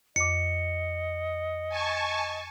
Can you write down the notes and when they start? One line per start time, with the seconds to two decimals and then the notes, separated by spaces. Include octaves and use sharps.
0.16 F2 D#5 D6 C#7
1.69 G#5 A5 C#6